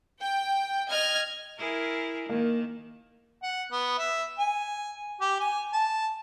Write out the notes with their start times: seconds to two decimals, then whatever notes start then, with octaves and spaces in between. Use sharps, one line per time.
0.20 G5
0.89 D#5 F6 G#6
1.58 E4 G#4 A#4
2.29 D#3 A#3
3.43 F#5
3.71 B3
3.98 E5
4.38 G#5
5.21 G4
5.40 G#5
5.73 A5